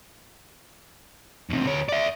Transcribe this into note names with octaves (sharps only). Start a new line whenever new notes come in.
E2 C3
D2 C#5
D5 E5